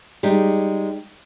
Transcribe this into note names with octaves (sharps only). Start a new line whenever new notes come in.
G3 G#3 D#4 G4